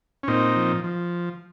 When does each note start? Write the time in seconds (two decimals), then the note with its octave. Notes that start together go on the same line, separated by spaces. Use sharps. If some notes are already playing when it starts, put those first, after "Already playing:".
0.23 C#4
0.28 A#2 C4 D#4
0.57 F3
0.84 F3